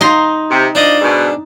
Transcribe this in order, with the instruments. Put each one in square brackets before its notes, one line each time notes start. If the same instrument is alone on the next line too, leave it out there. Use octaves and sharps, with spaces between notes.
[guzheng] D#4 A#5 C6
[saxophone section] C3
[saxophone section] F3 D5 D#5 [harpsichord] D4
[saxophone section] G#2 B2